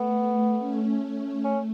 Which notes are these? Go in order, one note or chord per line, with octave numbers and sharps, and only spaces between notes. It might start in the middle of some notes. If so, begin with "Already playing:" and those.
Already playing: A3 B3
C#4
C#4
C#4
A3 C#4